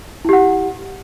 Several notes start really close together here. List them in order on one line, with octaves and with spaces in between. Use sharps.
E4 G4 F#5